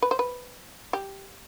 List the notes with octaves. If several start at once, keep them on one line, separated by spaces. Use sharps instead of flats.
B4
C5
B4
G4